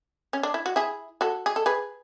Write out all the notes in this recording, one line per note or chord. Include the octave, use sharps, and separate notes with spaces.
C#4
D4
E4
F#4
E4 G#4
F#4 A4
G#4
A4
G#4 B4